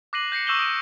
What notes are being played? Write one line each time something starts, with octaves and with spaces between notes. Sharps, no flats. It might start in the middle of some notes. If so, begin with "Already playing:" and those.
D6 F#6 A#6 C7 D#7 F#7
G6 A#6 C7 C#7
C#6 E6 G6 E7 F#7 G7
D6 D#6 D7